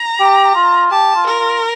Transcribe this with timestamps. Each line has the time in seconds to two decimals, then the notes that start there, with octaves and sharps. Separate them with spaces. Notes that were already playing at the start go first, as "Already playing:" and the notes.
Already playing: A#5
0.20 G4
0.55 F4
0.91 G4 A5
1.15 F4
1.27 A#4
1.39 F4